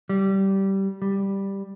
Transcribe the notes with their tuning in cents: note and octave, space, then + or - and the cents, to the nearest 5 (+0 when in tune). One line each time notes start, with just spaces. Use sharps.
G3 -15
G3 +5